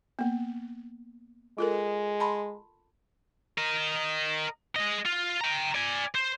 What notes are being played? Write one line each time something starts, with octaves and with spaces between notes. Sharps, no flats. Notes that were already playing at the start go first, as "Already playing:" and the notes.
A#3 B3
G#3 F4 A4 A#4
A5 B5 C6
A#4 D#5
G#3 D#5
F4
G5 A#5
D5 G#5
C5